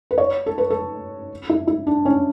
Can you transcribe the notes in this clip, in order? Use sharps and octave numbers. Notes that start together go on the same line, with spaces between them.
B4
C#5
A4
B4
A4
E4
E4
D4
C#4